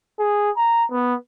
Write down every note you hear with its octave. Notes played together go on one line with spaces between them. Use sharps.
G#4
A#5
B3